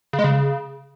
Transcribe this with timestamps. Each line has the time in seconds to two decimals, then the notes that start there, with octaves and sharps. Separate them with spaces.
0.13 C#3
0.19 G#3
0.24 C#3